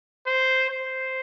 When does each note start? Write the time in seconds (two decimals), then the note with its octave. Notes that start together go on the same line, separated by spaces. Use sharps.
0.27 C5
0.70 C5